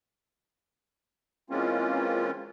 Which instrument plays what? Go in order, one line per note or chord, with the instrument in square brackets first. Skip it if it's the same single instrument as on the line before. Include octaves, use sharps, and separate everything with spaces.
[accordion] E3 G#3 A#3 C4 C#4 F4